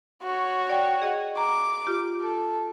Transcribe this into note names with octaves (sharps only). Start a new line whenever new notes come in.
F#4 C#5
D5 G5
G#4 D#5 F#5
A#5 D6
F4 G4
A4